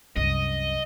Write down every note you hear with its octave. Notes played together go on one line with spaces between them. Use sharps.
C2 F#2 D#5